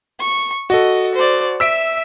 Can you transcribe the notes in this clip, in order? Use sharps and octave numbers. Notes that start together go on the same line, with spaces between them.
C#6
F#4 A4 D#5
C5 D5
E5 E6 B6 D7